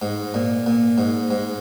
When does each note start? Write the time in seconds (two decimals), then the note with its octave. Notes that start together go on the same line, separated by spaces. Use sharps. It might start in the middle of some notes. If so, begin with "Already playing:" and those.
0.02 G#2
0.34 A#2
0.67 A#2
0.98 G#2
1.31 G#2